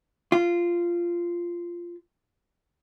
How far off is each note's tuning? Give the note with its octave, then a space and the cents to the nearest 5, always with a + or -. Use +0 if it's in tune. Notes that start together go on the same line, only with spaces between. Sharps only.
F4 -10